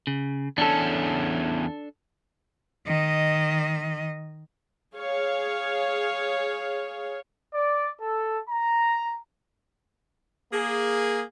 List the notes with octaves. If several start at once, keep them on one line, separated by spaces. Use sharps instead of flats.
C#3
E2 C#4 D4 A4
D#3 D#5
G#4 C#5 F5
D5
A4
A#5
A#3 G#4